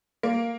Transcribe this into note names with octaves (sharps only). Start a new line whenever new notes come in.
A#3